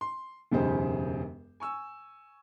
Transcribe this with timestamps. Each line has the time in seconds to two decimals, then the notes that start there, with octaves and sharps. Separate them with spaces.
0.01 C6
0.52 E1 F#2 C#3 D#4 G4 C5
1.60 G#5 C#6 E6